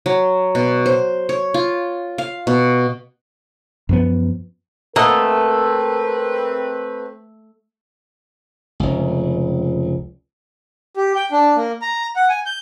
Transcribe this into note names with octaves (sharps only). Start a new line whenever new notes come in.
F#3
B2
C5
C#5
F4
F5
B2
F#2 F3 B3
A3 A#3 C4 A#4 B4 D#5 F#5
F1 C#2
G4
G5
D4
A#3
A#5
F#5
G#5
G6